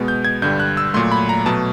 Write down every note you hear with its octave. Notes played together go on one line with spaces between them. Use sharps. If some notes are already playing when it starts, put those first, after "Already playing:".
Already playing: B2 G#3 B3
G6
G#6
G2 D3 G3 G6
F#6
E6
A#2 F#3 A3 C6
B5
A#5
B2 F#3 A3 A5